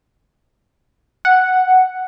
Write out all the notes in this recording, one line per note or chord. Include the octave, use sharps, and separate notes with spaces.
F#5